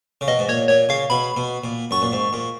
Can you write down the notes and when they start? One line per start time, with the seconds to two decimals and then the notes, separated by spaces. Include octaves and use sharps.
0.21 C#3
0.28 B2 D#5
0.39 G#2
0.49 A#2 C#5
0.68 A#2 C#5
0.89 C#3 F5
1.10 B2 B5
1.37 B2
1.64 A#2
1.91 F#2 C#6
2.02 A#2
2.12 G#2
2.33 A#2